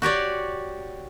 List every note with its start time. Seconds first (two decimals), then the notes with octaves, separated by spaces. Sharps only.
0.02 F#4 G4 C#5 D5